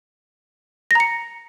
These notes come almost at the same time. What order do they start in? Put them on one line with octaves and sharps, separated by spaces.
A#6 A#5 C#7